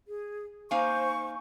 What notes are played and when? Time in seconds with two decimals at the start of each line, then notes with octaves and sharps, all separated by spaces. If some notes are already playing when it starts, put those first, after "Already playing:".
0.08 G#4
0.71 A#3 D#4 C5 F5 G#5 C#6